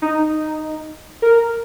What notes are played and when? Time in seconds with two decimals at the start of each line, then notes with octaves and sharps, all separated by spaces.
0.02 D#4
1.22 A#4